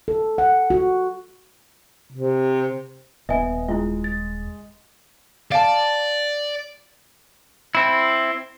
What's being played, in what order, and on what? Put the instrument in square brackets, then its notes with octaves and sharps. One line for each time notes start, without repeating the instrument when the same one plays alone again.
[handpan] A4
F#5
F#4
[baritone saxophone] C3
[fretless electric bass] D#1 [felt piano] B3 D#5 [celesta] E5 G#5
[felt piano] G#3 [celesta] E4 F4
[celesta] A6
[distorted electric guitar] D5 [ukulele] F5 A5
[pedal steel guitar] C4 E4